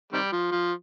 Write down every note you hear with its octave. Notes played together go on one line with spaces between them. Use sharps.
C3 D#3 G3
F3
F3